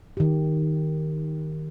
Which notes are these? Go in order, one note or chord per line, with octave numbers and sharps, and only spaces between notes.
D#3 G4